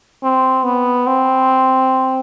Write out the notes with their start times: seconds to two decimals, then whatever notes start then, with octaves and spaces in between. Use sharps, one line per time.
0.23 C4
0.64 B3
1.07 C4